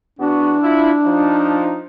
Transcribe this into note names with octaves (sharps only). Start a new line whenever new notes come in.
E2 B3 D4 F#4
E4 F4
F3 D#4